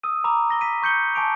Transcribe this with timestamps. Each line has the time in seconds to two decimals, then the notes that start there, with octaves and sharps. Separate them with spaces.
0.03 D#6 E6 D#7
0.24 A#5 B5 D6 E6
0.49 E6 A#6 G7
0.61 B6 D#7
0.82 C#6 G6 C#7 G7
1.15 G#5 A5 C#6 D6 D7 F7